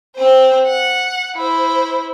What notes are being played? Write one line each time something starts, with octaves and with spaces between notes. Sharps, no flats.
C4 C5
F#5
E4 C5